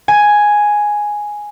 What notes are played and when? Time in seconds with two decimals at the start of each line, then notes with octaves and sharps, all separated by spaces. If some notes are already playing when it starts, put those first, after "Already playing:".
0.08 G#5